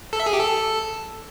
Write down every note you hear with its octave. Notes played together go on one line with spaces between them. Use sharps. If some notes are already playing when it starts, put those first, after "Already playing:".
A4
E5
G#4
G4
A4